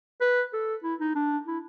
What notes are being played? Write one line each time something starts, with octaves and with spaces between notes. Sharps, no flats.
B4
A4
E4
D#4
D4
E4